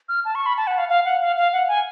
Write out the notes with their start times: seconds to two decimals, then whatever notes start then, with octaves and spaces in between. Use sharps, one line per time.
0.09 F6
0.25 A5
0.35 C#6
0.46 B5
0.57 A5
0.67 F#5
0.78 F5
0.89 F5
1.05 F#5
1.21 F5
1.37 F5
1.53 F#5
1.68 G#5